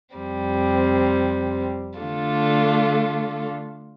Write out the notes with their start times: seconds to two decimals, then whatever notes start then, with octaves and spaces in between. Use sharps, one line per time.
0.16 F2 C3 G3 C4
1.99 D3 A3 D4 F4 A4